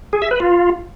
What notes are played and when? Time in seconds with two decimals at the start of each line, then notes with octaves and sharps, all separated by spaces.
0.13 G#4
0.22 E5
0.31 B4
0.40 F4